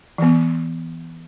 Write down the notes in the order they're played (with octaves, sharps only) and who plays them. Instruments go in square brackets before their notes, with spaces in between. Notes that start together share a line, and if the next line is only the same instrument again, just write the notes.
[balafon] E3 B3